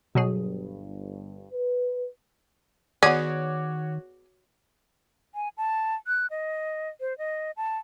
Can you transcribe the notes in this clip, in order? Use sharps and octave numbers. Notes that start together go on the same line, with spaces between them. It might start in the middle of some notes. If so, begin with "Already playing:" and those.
G1 G2 B2 F#3 G#4
B4
D#3 B3 F#4 G#4 C#5 D5 D6
G#5
A5
F#6
D#5
C5
D#5
A5